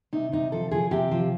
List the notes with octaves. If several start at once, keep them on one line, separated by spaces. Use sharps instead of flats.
C3 D#4
C3 D#4
F3 A4
F3 G#4
C3 G4
F3